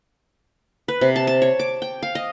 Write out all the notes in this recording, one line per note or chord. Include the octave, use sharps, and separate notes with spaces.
B4
C3
A5
A5
C#5
D6
G5
F5
D#5